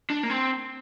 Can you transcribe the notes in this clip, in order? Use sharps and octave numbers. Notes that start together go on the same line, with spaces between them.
D4
A#3
C4